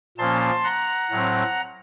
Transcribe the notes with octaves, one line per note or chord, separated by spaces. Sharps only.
A#2 F3 A#3 C#4 A5 C6
F#5 A#5
A2 F#3 C4